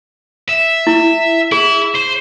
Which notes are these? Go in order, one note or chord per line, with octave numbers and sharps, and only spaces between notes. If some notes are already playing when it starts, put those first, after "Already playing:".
E5
E4
E4 G#4
C5